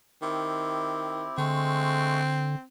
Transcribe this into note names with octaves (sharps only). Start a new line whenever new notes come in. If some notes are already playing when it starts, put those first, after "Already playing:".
D#3 C4 E4 G4
D3 G#3 A3 C4 C#6